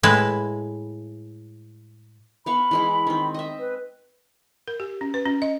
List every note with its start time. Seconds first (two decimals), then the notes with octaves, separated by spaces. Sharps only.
0.03 A2 G#3 E4 B4
2.46 B3 F5 B5 C#6
2.71 E3 G#3 E4
3.07 D#3 C4
3.34 D#5 E5
3.59 B4
4.68 A#4
4.80 G4
5.01 C#4
5.14 B4
5.26 C#4
5.42 D#5